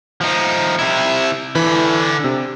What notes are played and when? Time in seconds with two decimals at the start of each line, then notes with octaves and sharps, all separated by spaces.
0.21 F3 D#4
0.79 C3 E4
1.55 D3 E3 B5
2.24 C3